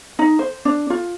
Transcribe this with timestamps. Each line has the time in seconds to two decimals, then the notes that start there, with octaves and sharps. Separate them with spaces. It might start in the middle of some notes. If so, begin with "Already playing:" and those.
0.19 D#4
0.39 C5
0.65 D4
0.90 F4